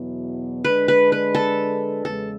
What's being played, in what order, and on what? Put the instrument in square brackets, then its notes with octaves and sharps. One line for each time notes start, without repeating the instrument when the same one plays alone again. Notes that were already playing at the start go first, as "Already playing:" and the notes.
Already playing: [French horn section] E2 B2 F#3 B3 E4
[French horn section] D3 G#3 D4 [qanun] B4
[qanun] B4
B4
A4
[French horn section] E2 C#3 G#3 [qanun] A4